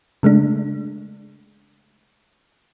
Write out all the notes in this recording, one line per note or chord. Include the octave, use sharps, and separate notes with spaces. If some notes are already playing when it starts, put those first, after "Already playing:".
C#3 G#3 A3 D4